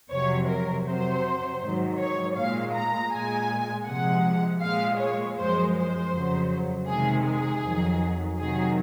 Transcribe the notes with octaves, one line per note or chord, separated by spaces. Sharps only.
F2 C3 F#3 C#5
A#4
C3 F#3 C5
G#2 D#3 F#3
C#5
A#2 G#3 F5
A#5
A#2 G#3 G#5
C3 F3 G#3 F#5
A#2 G#3 F5
C#5
F#2 F3 G#3 C5
C5
F2 C#3 F#3
C3 D#3 G#3 G#4
G#4
F2 D#3 F#3
C3 D#3 F#3 G#4